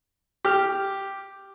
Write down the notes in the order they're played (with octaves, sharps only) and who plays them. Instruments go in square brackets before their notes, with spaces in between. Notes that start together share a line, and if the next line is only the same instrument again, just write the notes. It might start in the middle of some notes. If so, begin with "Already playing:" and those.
[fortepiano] G4 F6